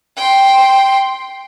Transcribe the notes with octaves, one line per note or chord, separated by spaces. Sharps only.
G5 C6